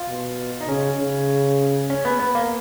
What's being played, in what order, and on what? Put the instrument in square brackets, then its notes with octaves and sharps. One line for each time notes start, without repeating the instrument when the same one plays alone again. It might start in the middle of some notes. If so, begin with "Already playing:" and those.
Already playing: [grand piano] F4
[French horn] B2
[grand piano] D#4
[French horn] C#3 [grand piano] C#4
[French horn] C#3
[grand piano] C#4
B3
B3
A#3